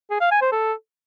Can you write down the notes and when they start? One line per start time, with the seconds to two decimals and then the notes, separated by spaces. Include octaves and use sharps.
0.11 G#4
0.21 F5
0.31 G#5
0.42 C5
0.52 A4